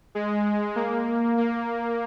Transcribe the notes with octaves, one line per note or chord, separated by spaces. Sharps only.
G#3
A#3
A#3